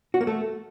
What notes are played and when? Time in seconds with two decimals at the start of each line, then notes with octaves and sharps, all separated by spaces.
0.14 F#4
0.21 A#3
0.27 A3